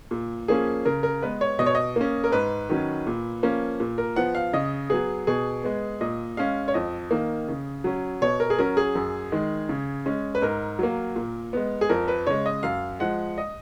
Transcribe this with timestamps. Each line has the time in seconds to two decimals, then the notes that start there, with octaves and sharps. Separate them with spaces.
0.11 A#2
0.48 F3 A#3 C#4 G#4
0.85 C#3 A#4
1.03 A#4
1.22 G#3 B3 B4
1.41 C#5
1.59 B2 D#5
1.66 C#5
1.75 D#5
1.96 A#3 C#4
2.24 A#4
2.32 G#2 B4
2.70 D#3 F#3 C#4
3.07 A#2
3.43 F3 A#3 C#4
3.80 A#2
3.98 A#4
4.16 F3 B3 F#5
4.35 F5
4.53 C#3 D#5
4.90 F#3 B3 G#4
5.27 B2 G#4
5.64 G#3 B3
6.01 A#2 D#5
6.37 G#3 C#4 F5
6.68 C#5
6.74 F2 D#5
7.11 D#3 A#3
7.48 C#3
7.84 F#3 C#4
8.22 B2 C#5
8.40 A#4
8.50 G#4
8.59 F#3 C#4 A#4
8.77 G#4
8.95 F#2
9.32 D#3 G#3
9.69 C#3
10.06 G#3 C#4
10.35 B4
10.42 G#2 A#4
10.79 F#3 A#3
11.16 A#2
11.53 G#3 B3
11.81 G#4
11.89 F2 A#4
12.08 B4
12.27 C#3 G#3 C#5
12.46 D#5
12.63 F#2 F5
13.00 F3 G#3 F#5
13.38 D#5